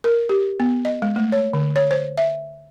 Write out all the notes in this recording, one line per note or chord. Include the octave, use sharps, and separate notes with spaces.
A#4
G4
B3
D#5
G#3
A3
C#5
D3
C#5
C5
E5